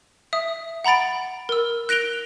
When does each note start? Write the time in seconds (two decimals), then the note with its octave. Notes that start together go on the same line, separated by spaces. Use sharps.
0.33 E5 D#6
0.84 F#5 A#5 B5 A6 D7
1.49 A#4 E6
1.89 F#6 A#6 D7 F7 G7